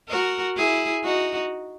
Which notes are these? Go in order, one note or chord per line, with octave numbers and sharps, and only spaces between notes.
F#4 A#4
E4 G#4
D#4 F#4